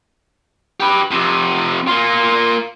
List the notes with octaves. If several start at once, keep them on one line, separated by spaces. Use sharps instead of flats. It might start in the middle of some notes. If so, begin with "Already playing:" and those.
G4 B4
F2 C3
A#3 F4